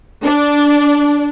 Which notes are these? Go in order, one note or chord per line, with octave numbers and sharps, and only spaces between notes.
D4